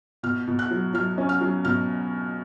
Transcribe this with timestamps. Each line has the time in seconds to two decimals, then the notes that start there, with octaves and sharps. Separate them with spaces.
0.23 B2 F6
0.48 B2
0.59 F#6
0.71 F#3
0.94 F#3 F6
1.18 C#4
1.29 F6
1.41 F#3
1.65 B2 F6